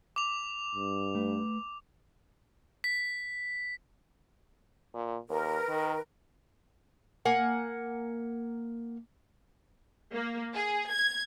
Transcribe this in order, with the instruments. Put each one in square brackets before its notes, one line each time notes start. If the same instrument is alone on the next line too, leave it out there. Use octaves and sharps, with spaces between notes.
[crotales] D6 F7
[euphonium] G2
[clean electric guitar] A3 B4
[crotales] B6
[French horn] A#2
[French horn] D#2 [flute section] A#4 B4
[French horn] D#3
[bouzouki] A#3 F#5 G#5
[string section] A#3
G#4
G#6